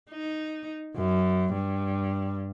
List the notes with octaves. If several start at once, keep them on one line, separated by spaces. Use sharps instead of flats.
D#4
F#2
G2